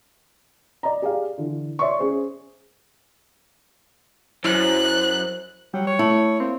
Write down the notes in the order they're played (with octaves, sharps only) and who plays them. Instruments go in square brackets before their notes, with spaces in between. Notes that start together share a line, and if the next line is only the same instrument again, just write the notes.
[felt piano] D5 D#5 A#5
G4 G#4 D5 F5
D3 E3
C#5 D5 E5 C6 C#6
C#4 G#4 C5
[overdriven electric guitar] F#2 [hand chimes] E4 [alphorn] C5 [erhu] F#6
[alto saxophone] F#3 [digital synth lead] G3
[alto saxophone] C#5
[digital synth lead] A3 [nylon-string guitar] E4
[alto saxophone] A#3 [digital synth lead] C4